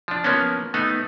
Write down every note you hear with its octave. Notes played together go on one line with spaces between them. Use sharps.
F3 D4
F3 A#3 B3 C#4
A3 B3 D#4